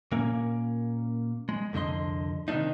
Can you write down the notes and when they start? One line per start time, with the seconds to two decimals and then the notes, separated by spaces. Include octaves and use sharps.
0.12 A#2 A#3 C#4
1.49 G#3
1.73 C2 F2 D3 D#5 C6
2.48 C3 D#3 F3 A#3 D4 D#4